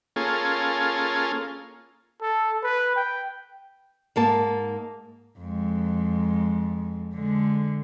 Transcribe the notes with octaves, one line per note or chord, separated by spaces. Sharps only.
A#3 C#4 F4 G#4 A4
A4
B4
G5
G#2 A#3 A5
F2 G#3
D3 G#3